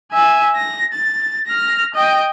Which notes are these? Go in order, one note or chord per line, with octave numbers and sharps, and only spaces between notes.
E5 G#5
A#6
A6
F6 A#6
D#5 G5